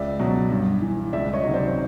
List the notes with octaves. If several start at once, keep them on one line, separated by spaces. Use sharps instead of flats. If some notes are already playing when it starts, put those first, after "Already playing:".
Already playing: C#2 D5 E5
B2 F#3
G2
E3
C#2 D5 E5
C#5 D#5
C3 D#3 F#3
C5 D5